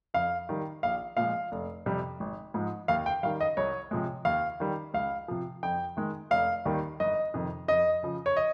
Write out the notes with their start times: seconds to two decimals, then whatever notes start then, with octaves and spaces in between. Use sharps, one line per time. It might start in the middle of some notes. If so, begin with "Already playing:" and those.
0.14 F2 F5
0.49 D#3 G3
0.83 A#1 F5
1.17 A#2 F3 G#3 F5
1.52 F1
1.86 F2 C3 G3
2.20 G#1
2.54 G#2 F3 G#3
2.88 D#2 F5
3.06 G5
3.23 D#3 G3 F5
3.41 D#5
3.57 C2 C#5
3.91 C3 F3 G#3
4.25 D#2 F5
4.60 D#3 G3
4.94 C#2 F5
5.28 C3 F3
5.63 F2 G5
5.97 D#3 G#3
6.31 F1 F5
6.65 D#2 D#3 G3
7.00 G1 D#5
7.34 F2 C3 D#3
7.68 F2 D#5
8.03 C#3 F3
8.26 C#5
8.37 D#5